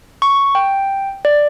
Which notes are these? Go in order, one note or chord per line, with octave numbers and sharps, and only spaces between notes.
C#6
G5
D5